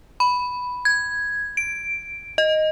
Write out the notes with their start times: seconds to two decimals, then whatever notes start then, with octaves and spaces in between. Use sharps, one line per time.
0.20 B5
0.85 G#6
1.57 D7
2.38 D#5